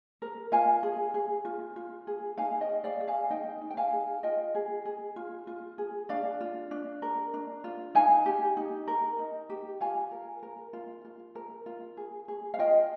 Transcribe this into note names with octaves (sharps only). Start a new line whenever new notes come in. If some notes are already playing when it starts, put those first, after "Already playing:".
A#4
F4 F5 G#5
G#4
G#4
F4
F4
G#4
D#4 F5 G#5
D#5 G5
G#4
D5 F5
G#4
F5 G#5
D#4 D#5 G5
D#4
G5
F5 G#5
G#4
F4 D#5 G5
G#4
G#4
F4
F4
G#4
D4 D5 F5
F4
D4
A#4
D4
F4
D#4 F5 G#5
G4
D#4
A#4
D#4
G4
F4 F5 G#5
A#4
A#4
F4
F4
A#4
F4
G#4
G#4
F5
F4 D#5 G5